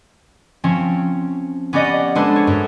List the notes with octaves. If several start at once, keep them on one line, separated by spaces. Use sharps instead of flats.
F3 C4 C#4
B3 C#4 G4 D5 D#5 F#5
G#3 D4 G#4 A4 B4 C5
C#5
F#2